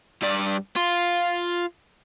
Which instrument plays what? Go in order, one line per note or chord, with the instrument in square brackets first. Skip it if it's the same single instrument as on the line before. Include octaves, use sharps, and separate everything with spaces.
[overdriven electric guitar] G2 D5
F4